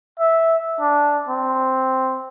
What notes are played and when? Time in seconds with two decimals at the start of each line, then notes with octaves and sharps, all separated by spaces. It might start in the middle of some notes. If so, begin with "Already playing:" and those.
0.20 E5
0.81 D4
1.28 C4